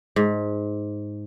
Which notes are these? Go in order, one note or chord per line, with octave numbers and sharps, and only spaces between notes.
G#2